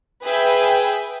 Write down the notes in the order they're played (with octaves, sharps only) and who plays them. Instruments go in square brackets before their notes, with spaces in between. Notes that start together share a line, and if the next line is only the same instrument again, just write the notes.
[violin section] G#4 B4 E5 G5